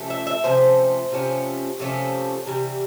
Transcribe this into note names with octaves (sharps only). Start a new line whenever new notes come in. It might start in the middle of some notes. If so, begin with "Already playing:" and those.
Already playing: C3 F3 A3 C#4
E5
E5
C3 F3 A3 C#4 C5
C3 F3 A3 C#4
C3 F3 A3 C#4
C3 E3 G3